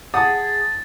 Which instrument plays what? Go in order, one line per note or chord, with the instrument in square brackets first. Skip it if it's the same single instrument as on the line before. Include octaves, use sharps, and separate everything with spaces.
[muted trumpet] G#4 [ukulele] F#5 [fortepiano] A5 D#6 [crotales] A6